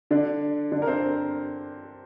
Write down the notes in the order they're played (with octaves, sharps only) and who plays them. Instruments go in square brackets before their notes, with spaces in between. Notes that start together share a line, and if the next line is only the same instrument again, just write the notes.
[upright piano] D3 D4
D3 D4
A#4
C4 C5